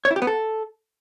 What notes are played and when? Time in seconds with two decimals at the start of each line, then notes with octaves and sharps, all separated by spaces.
0.05 C#5
0.11 E4
0.16 G4
0.22 B3
0.27 A4